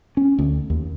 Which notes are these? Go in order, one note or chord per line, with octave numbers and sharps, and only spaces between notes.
C#4
D2
D#2